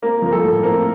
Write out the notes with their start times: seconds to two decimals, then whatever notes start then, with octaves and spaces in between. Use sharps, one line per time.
0.02 A#3 C4 A#4
0.22 F3 A#4
0.33 A4
0.43 A2
0.63 A#3 C4 A#4